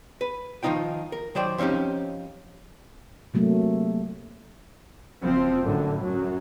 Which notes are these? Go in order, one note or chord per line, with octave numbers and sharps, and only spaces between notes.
B4
D#3 F3 G3 D#4 F4 G5
A#4
D#3 F#3 C5 D5 G5
F3 C4 C#4 D#4 G4
C3 F#3 A3 A#3
F#1 F3 C4
F#2 A2 D3
F#2 F#3